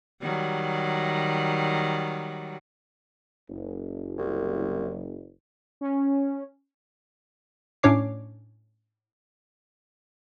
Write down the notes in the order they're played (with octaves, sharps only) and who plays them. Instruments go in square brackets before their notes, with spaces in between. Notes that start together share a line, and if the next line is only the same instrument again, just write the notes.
[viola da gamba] D#3 F#3 G3
[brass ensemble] F#1
[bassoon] C2
[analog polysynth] C#4
[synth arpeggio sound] A2 C#4 D4 C#5 D6 C7